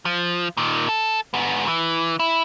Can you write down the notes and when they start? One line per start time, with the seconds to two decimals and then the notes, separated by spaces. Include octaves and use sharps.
0.05 F3
0.57 A#2 D#3
0.89 A4
1.34 G#2 B3
1.68 E3
2.19 E4